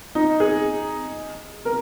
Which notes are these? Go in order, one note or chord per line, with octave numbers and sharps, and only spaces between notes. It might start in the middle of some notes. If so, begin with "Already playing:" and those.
D#4
G#4
A#4